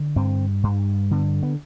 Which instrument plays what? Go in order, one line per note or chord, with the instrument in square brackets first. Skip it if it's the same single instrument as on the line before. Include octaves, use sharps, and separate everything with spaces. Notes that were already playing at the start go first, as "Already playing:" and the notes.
Already playing: [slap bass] D3
G2 C4
G2
D3 B3
B3